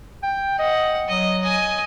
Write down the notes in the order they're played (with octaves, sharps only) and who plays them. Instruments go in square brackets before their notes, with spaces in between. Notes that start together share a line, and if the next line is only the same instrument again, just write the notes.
[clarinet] G5
[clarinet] D#5 [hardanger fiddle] F#5
[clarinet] F#3 [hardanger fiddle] D#5
[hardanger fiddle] D#5 G#5